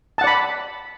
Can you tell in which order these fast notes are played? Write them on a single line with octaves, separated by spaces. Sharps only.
A5 F#5 D5 B5